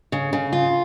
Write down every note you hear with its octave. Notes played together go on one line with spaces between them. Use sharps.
C#3
C#3
F4